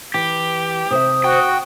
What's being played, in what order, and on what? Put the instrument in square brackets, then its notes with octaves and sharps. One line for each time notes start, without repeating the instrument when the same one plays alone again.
[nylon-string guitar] E3 [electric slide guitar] G4
[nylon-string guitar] C3 C5 E5 [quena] D#6
[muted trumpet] F#4 [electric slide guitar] G5